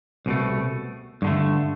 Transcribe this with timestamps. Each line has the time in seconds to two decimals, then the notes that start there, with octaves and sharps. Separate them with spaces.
0.26 C2 B2 A3
1.22 G2 D3 A3